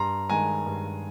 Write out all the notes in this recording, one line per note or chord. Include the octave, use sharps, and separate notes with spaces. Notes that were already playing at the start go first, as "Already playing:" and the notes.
Already playing: G2 A#5 C6
D#3 G#3 G#5 A#5
G2